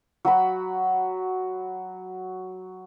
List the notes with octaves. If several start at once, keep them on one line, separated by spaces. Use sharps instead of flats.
F#3 F#4 B5